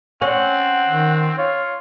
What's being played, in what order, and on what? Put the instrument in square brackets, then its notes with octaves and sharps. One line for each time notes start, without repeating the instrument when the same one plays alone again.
[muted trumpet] C4 [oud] C#4 [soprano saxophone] F#5
[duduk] D#3
[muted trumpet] F4 [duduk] C#5 [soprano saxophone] F5